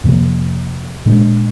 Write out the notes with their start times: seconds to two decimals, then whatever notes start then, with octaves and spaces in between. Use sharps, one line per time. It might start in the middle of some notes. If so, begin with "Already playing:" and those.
0.04 F2 C3 F3 A#3
1.06 A#2 G#3 D4